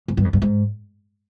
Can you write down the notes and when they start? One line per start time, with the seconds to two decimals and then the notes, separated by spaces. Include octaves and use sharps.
0.08 G#2
0.17 G2
0.25 F2
0.33 G2
0.42 G#2